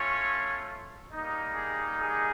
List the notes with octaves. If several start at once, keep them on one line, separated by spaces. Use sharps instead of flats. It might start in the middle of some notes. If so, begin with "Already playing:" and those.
Already playing: A3 C#4 F4 C#5
G3 A#3 D#4
G#4
G#4